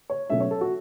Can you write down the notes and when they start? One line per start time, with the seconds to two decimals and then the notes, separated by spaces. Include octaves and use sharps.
0.10 C#5
0.30 B2 F#3 A3 C#4 E5
0.41 C#5
0.51 A4
0.61 F#4